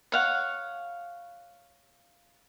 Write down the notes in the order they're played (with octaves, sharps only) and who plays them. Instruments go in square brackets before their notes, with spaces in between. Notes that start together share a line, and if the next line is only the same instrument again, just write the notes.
[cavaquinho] C#5 F5 F#5